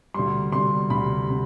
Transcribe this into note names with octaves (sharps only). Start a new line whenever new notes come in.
D2 C3 G3 C6
D2 C3 G3 C6
D2 C3 G3 B5
C3